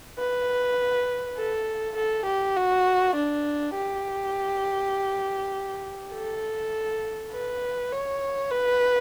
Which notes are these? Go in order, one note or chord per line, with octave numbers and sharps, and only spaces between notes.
B4
A4
A4
G4
F#4
D4
G4
A4
B4
C#5
B4